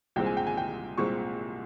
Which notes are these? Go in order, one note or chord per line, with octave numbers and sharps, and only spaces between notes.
C2 A#2 G#3 C4 G5
G#5
G5
G#5
G5
C2 A#2 G#3 C4 C#6